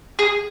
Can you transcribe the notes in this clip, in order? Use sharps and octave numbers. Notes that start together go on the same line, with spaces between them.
G#4